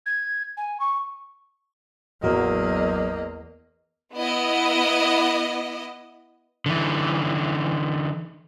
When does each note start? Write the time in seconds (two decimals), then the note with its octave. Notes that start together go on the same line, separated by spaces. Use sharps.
0.06 G#6
0.57 G#5
0.79 C#6
2.23 A1 E2 F#3 A#3 A#4 D#5
4.14 B3 E4 D#5
6.66 D3 E3